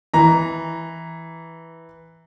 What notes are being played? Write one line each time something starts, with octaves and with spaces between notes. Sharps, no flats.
E3 A#5